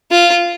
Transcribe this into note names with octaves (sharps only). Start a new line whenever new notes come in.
F4